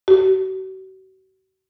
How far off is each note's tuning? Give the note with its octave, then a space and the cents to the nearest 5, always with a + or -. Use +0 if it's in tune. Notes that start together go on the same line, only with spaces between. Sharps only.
F#4 +40